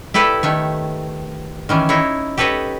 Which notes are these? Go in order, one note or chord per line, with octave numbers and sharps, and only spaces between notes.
E4 G4 A4 B4 D5
D#3 A3 C#5
D#3 E3 C#4
D#4 E4 C#5
G4 A4 B4 C#5 D#5